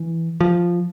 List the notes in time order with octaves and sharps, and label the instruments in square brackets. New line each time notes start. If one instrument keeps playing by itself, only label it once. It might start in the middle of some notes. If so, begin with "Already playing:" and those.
Already playing: [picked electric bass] E3
F3